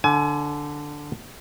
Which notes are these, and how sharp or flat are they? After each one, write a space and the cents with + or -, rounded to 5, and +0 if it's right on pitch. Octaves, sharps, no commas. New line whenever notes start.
D3 +0 G#5 +30